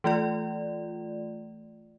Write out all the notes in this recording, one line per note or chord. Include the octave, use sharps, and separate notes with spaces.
E3 A3 F4 D5